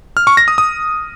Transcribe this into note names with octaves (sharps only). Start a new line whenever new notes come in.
F6
C#6
A#6
D#6
D#6